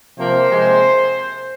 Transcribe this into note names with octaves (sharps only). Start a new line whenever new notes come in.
C3 F3 A#3 C5
C3 G#3